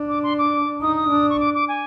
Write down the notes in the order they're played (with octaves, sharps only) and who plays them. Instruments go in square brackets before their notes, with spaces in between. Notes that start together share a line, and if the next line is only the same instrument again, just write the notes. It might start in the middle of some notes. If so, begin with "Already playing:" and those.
Already playing: [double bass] D4
[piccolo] D6
C6
D6
[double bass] D#4 [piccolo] D#6
[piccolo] D#6
[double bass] D4
[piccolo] C#6
D6
D6
G#5